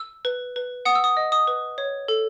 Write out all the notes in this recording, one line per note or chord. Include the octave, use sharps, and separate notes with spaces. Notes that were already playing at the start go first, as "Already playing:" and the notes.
Already playing: E6
B4
B4
F#5 D#6
E6
D#6
D#5
D#6
B4
C#5
A4